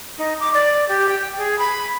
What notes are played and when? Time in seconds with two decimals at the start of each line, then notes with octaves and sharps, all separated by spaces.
0.18 D#4
0.40 D6
0.54 D5
0.89 G4
1.09 G5
1.38 G#4
1.59 B5